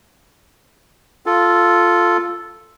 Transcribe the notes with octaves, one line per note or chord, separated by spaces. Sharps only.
F4 A4